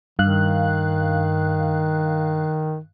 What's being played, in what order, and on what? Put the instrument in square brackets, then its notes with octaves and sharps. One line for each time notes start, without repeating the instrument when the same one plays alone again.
[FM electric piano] G2 F5 F#6 [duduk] D#3